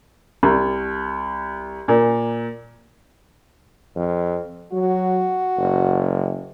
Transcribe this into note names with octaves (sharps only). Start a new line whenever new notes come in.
C2
A#2
F2
F#3 F#4
F#1